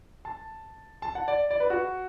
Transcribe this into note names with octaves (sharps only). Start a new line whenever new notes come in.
A5
A5
F#5
D5
D5
B4
F#4